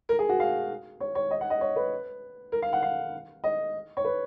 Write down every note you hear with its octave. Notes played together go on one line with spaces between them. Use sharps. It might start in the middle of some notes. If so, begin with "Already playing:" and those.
A#4
G#4
F#4
F5
C#5
C#5
D#5
F#5
D#5
C#5
B4
A#4
F5
F#5
F5
D#5
C#5
B4